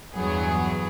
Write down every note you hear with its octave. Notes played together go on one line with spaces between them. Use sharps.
E2 G2 F#3 B3 G#4